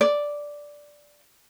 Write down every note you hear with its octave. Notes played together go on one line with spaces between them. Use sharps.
D5